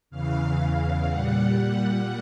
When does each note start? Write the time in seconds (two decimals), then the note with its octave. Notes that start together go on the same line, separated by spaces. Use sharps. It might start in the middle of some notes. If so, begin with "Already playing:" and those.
0.10 E2 C#3 E3 F5
0.60 F5
1.08 A#2 G3 F#5
1.57 F#5